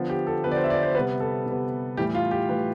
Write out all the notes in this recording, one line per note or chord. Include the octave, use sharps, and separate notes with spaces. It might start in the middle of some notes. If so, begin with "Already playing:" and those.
Already playing: D3 F3 B3
G4
A4
D3 F3 B3 B4
D5
C5
E5
D5
C5
C3 G3 B3 B4
A4
C3 G3 B3
A2 E3 G3 G4
F4
G4
A2 E3 G3 B4